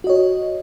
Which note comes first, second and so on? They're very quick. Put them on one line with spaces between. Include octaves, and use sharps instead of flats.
F#4 D#5 C#5